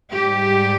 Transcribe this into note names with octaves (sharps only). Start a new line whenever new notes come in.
G#2 G3 G4